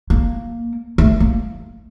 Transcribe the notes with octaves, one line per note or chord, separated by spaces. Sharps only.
A#3
A3
A#3